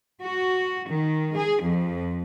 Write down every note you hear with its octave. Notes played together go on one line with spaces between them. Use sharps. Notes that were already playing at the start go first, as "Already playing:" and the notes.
F#4
D#3
G#4
F2